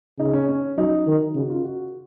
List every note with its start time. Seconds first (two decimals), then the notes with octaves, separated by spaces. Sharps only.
0.19 C#3 D#4
0.33 C#4
0.48 C#4
0.78 F#3 D#4
1.07 D#3
1.35 C#3 F#4
1.50 F4
1.64 F#4